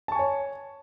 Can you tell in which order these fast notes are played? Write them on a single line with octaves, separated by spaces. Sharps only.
A5 C#6 G#5 C#5